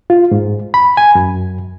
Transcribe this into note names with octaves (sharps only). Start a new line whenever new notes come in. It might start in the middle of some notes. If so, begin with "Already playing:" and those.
F4
G#2
B5
G#5
F#2